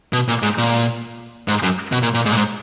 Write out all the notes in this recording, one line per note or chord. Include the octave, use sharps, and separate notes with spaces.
B2
A#2
G#2
A#2
G#2
F#2
B2
A#2
A#2
G#2
A#2
G#2